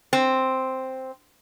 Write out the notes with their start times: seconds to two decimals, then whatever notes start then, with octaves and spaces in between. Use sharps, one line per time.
0.13 C4